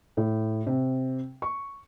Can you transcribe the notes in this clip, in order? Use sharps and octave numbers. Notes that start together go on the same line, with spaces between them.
A2
C3
C#6